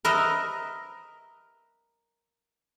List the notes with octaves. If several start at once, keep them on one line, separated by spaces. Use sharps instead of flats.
A#4 B4 D#5 E5